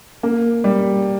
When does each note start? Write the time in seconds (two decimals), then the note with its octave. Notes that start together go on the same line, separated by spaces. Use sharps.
0.23 A#3
0.64 G3